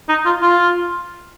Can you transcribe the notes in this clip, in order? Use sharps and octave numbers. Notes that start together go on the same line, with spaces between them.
D#4
F4
F4